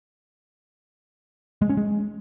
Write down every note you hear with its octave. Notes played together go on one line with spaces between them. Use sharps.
G#3
C#4
G#3